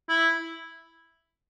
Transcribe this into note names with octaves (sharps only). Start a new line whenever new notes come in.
E4